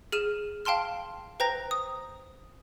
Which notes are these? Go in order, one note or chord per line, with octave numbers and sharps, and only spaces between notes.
G#4 F6 D#7 E7
F5 G5 A5 C6 F6
B4 C5 G5 A#5 A#6
D#6